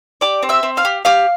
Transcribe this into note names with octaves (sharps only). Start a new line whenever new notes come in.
G4 D5 D6
C4
E5 E6
C4
F5 F6
G4
G4 F5 F6